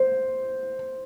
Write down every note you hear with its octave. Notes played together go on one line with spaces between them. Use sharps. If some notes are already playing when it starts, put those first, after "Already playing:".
Already playing: C5